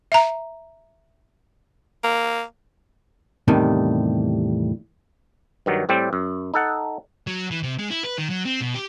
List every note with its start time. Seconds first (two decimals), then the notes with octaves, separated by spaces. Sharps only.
0.12 E5 A#5
2.04 A#3
3.48 E2 A2 C3 D#3 G3
5.66 G2 D#3 F#3
5.89 A2 G3 C4 D5 G5
6.13 F#2
6.54 D#4 A4 F#5
7.27 F#3
7.51 E3
7.63 C3
7.78 G#3
7.90 E4
8.04 B4
8.18 D#3
8.30 F#3
8.46 C4
8.62 B2
8.75 G4